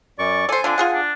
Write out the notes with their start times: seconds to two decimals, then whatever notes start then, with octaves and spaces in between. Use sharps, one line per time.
0.19 F#2 D5 C#6
0.49 A4 C5 D5 G#5
0.64 D3 F3 C4 D4
0.78 F4 G#4 F#5
0.93 D4